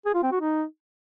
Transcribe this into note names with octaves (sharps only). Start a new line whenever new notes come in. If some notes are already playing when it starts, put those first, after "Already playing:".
G#4
F4
C4
F#4
D#4